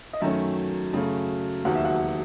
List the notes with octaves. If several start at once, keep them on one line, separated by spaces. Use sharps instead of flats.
D#5
F#2 D#3 F#3 A3 C#4 E5
F#2 C#3 F#3 A3
E1 D#2 D#3 F#3 F#5
E5
F#5